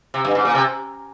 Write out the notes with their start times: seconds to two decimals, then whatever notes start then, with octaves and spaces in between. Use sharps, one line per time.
0.14 C3
0.25 G2
0.35 G#2
0.45 A#2
0.55 C3